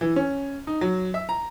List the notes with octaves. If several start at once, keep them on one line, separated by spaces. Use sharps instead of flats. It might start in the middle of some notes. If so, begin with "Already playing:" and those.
E3
C#4
D#4
F#3
E5
A#5